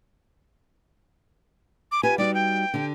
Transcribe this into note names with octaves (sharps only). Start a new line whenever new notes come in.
D6
F4 G4 B4 G#5
G3 D#4 F#4 D5
G5
D3 G4